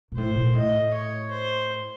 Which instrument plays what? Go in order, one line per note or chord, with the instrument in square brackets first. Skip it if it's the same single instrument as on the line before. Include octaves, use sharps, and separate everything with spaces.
[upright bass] A#2
[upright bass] A2 [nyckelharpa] C5
[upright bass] A#2
[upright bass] A2 [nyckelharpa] D#5
[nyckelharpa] C#5
C5